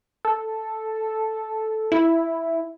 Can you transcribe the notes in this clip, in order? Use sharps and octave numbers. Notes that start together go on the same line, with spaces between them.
A4
E4